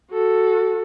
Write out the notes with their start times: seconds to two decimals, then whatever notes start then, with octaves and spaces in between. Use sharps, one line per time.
0.11 F#4 A4